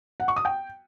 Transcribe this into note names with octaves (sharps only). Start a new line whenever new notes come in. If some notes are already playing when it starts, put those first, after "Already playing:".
F#5
C#6
D#6
G5